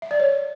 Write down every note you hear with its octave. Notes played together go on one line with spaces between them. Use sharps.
E5
D5
C#5